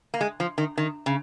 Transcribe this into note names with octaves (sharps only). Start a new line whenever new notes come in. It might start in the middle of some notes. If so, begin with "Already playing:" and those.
A#3
G#3
F3
D#3
D#3
C#3